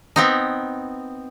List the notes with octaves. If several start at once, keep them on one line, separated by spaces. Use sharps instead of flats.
B3 C4 D#4